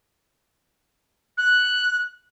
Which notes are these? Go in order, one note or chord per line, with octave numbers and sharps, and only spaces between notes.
F#6